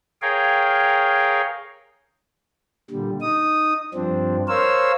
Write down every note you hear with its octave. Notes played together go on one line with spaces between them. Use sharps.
G#4 A#4 C#5 F5 G5
A#2 D3 G3
D#4 D#6
G2 F3 C4 D4
A#4 C5 C#5 F5 E6